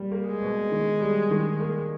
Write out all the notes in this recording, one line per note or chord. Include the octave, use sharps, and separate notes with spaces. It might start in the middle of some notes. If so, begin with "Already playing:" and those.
Already playing: G3 A#3
A#3
G#3
B2
D#3
G3
D#3
A#3